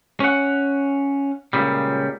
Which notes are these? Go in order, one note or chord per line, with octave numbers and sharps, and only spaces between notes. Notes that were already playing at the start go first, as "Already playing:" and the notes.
C#4 F#5
C#2 A#2 C#3 G3